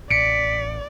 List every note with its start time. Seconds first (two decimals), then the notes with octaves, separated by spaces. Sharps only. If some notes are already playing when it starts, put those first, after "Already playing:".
0.11 A1 D5 B6 C#7 D7